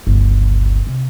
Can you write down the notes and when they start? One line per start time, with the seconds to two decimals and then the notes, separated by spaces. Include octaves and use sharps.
0.07 G1 C#2
0.87 C3